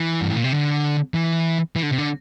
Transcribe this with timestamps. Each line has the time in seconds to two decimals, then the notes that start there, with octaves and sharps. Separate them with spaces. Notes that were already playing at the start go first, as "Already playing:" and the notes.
Already playing: E3
0.21 G2
0.29 A2
0.36 A#2
0.44 C3
0.52 D3
1.14 E3
1.76 E3
1.83 D3
1.91 C3
1.98 D3